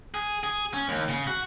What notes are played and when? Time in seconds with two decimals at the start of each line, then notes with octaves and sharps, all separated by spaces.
0.14 G#4
0.43 G#4
0.74 C#4
0.89 D#2
1.08 C#3
1.27 F#4